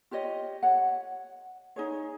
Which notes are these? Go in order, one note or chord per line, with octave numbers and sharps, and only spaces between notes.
F4 G4 C#5 D#5
C#5 F#5
D#4 G#4 C#5